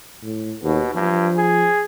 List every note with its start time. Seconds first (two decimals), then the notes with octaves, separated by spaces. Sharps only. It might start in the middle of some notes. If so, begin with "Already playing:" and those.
0.22 A2
0.63 D#2 B2
0.95 G2 F3
1.37 G#4